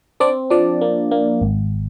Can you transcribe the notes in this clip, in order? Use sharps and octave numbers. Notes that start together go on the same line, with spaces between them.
C4 D4 D5
F3 D4 D5
A#3
A#3
G#1